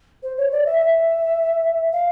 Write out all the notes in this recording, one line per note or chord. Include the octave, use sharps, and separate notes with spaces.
C5
C#5
D5
E5
E5
F5